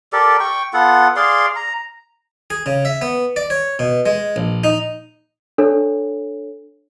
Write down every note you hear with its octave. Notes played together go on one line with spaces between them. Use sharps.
G4 A4 A#4 D5
G5 C#6
B3 F4 A4 F#5
G#4 D5 F5 C6
A#5
G#4
C#3
E5
B3
D5
C#5
B2
G#3
A#1
D#4
D4 A4 C#5